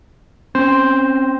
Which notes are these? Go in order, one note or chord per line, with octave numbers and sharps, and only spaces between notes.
C4 C#4 C5